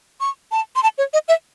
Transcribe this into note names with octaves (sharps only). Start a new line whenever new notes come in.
C#6
A5
C6
A5
C#5
D#5
E5